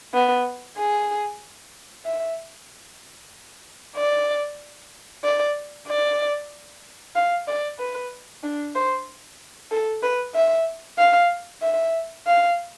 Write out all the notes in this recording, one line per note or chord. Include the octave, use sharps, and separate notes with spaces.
B3
G#4
E5
D5
D5
D5
F5
D5
B4
D4
C5
A4
B4
E5
F5
E5
F5